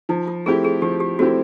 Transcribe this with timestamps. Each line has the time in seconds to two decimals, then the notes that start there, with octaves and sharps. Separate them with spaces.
0.09 F3 D#4
0.28 F4
0.46 A3 C4 E4 G4 G#4
0.64 G#4
0.82 F3 G4
1.00 G4
1.19 A3 C4 E4 F#4 G4